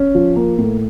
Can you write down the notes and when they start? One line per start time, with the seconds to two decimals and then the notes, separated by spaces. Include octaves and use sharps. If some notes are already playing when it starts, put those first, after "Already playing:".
Already playing: C#4
0.15 F3
0.36 A#3
0.58 A2